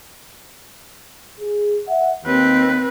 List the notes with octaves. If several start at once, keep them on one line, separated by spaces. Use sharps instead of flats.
G#4
E5 F#5
D#2 C4 B4